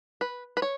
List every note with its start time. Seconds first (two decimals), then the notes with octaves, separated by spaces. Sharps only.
0.21 B4
0.57 B4
0.62 C#5